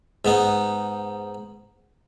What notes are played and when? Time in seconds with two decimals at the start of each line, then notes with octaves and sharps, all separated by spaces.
0.25 G#2 B3 D#4